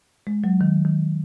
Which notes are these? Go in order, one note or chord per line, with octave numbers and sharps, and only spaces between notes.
G#3
F#3
D#3
D#3